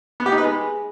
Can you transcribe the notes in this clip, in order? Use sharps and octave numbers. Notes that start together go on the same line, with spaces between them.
B3
G4
D#4
B4
G#3